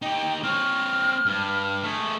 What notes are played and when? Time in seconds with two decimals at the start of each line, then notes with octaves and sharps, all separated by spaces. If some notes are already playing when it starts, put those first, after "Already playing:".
0.02 D#4 G4 G5
0.43 C4 C#5 F6
1.26 G2
1.83 A3 G#4